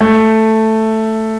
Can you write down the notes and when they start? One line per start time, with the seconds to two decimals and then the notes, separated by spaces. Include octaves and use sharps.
0.01 A3